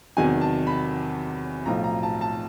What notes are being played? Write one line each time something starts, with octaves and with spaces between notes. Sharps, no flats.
E2 C3 D#3 F#3 G#5
A5
B5
B1 A2 F3 A#5
A#5
A5
A5